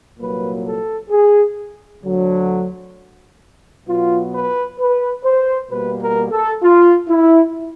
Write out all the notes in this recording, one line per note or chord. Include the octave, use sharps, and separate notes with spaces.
C2 A#2 F#3 A#3 B4
A4
G#4
D2 D3 F#3
B2 F#3 B3 F4
B4
B4
C5
B2 G3 A#3 B4
A#4
A4
F4
E4